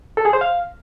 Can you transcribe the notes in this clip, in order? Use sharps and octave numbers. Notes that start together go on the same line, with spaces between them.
A4
G#4
C5
F5